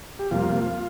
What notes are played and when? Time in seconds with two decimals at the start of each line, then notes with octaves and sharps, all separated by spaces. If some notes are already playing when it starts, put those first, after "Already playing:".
0.19 G4
0.31 F2 C3 G3 A#3 F4